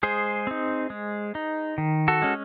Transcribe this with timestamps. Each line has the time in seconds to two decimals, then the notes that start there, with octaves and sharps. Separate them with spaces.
0.03 G#3 G#4 C5
0.47 C4 D#4
0.90 G#3
1.35 D#4
1.78 D#3
2.08 F#4 A4
2.22 G#3 C#4